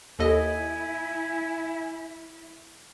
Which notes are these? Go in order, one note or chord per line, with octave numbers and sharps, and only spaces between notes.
D#2 E4 A4 D#5 G#5